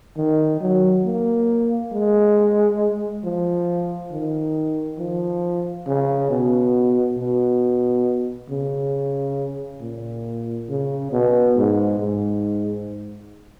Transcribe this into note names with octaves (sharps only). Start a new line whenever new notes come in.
D#3
F#3
A#3
G#3
F3
D#3
F3
C#3
B2
B2
C#3
A#2
C#3
B2
G#2
G#2